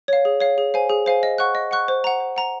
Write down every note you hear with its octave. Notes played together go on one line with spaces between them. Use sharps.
C#5 F5
G#4
C#5 F5
G#4
C5 F5 G#5
G#4
C5 F5 G#5
D#5
F#5 C#6 F#6
D#5
F#5 C#6 F#6
C5
F#5 A#5
C5
F#5 A#5